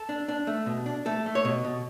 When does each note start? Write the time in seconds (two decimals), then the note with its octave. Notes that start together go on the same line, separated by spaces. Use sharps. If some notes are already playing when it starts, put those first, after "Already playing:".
Already playing: A4
0.09 D4
0.29 D4
0.47 A3
0.66 B2
0.86 D4
1.06 A3 A4
1.26 A3
1.35 C#5
1.45 B2
1.65 B2